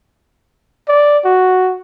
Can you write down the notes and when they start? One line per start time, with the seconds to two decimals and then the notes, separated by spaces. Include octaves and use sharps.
0.88 D5
1.25 F#4